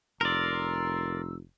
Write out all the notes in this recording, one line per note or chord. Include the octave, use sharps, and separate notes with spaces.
F1 A#4 D5 A#5 C6 E6